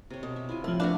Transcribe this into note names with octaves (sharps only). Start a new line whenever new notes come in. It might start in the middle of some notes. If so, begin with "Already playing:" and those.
C3 C#5
B2
E5
E4 F4 G#5
A2 F3 E5
A3 D4 F#4 F5